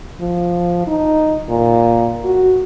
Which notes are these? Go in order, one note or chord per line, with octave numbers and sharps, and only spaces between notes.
F3
D#4
A#2
F#4